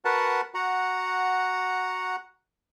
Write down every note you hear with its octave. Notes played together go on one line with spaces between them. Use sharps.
F#4 A#4 B4 F#5 A5
F#4 F#5 A#5